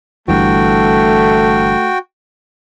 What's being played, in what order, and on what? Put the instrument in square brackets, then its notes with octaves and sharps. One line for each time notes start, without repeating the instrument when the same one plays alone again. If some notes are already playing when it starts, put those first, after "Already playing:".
[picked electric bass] G1 G2 E3 [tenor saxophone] A3 [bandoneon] F#4 G5